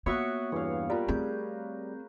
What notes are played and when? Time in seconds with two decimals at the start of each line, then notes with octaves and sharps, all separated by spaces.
0.06 A#3 B3 F#4 C#5 E5 F#5 C#6 C#7
0.52 E2 G2 E3 C#5 F5
0.90 G3 F4 A#4 B4 D5
1.08 A3 C4 G#4 G6